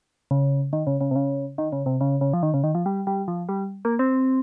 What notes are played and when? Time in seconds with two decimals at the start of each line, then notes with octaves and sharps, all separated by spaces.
0.31 C#3
0.73 D#3
0.87 C#3
1.01 C#3
1.11 C3
1.15 C#3
1.58 D#3
1.72 C#3
1.86 C3
2.01 C#3
2.21 C#3
2.33 F3
2.43 D#3
2.54 C#3
2.64 D#3
2.75 F3
2.86 G3
3.07 G3
3.28 F3
3.49 G3
3.85 A#3
3.99 C4